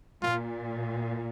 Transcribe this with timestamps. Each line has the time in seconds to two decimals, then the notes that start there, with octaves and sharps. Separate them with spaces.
0.22 A#2 F4